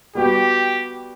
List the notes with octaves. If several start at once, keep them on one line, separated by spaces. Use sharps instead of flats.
G3 B3 F#4 G4